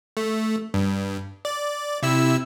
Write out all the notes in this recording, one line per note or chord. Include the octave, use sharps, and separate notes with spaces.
A3
G2
D5
C3 E4 E6